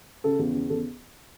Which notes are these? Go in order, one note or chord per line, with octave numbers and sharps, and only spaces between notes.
C#3 A4
E2
C#3
E2 A4